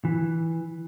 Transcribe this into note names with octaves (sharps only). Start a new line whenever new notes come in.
E3